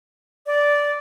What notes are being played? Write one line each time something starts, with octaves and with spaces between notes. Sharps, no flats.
D5